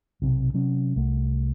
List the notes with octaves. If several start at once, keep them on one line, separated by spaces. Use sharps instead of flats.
B1 C3
C3 F#3 C#4
C2 A3